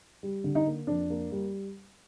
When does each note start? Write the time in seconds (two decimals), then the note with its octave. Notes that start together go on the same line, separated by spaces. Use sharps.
0.23 G3
0.44 D3
0.55 D#4
0.67 A#3
0.87 F2 D4
1.10 A#3
1.32 G3